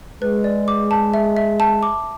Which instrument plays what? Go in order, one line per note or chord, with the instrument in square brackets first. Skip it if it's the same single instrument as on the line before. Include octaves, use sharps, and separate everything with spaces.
[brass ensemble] G#3 [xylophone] B4
[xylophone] D5
D6
A5
E5
E5
A5
D6